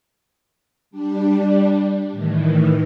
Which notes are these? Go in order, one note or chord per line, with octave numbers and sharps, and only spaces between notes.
G3 D4
A2 D#3 E3